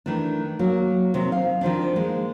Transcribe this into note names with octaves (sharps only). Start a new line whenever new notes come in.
D#3 E3 A3 D4
F#3 A#3
C3 D#3 F#3
F5
D#3 F3 C4 D4
G#3 A#3